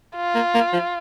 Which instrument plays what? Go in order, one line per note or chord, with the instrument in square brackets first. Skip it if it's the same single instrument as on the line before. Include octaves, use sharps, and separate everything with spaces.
[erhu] F4
[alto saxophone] A#3
A#3
F3